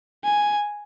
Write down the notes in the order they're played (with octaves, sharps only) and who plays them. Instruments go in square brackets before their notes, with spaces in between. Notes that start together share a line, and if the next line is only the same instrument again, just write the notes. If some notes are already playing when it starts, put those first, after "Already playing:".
[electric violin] G#5